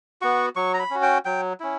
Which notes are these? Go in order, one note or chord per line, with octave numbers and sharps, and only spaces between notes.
B3 F#4 C#6
F#3 C#6
A#5
B5
C#4 F#4
G5
F#3 G5
C#4 E4